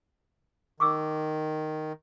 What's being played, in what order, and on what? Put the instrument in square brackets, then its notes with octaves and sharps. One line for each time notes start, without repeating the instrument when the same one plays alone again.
[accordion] D#3 [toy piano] C#6 D6 E6